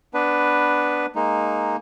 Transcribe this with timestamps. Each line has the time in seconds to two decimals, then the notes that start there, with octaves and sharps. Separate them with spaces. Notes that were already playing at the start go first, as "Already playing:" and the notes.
0.14 B3 D4 B4
1.16 G#3 A#3 D#4